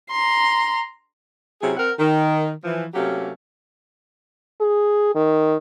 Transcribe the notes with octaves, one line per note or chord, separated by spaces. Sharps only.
A#5 C6
C3 F#3 C#4 E4 G#4
C4 A#4 F#5
D#3
E3 F3
C3 F#3 A3 A#3 C#4 G4
G#4
D#3